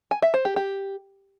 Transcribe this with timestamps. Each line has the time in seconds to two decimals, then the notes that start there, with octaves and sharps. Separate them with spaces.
0.11 G#5
0.22 E5
0.34 C5
0.45 G4
0.56 G4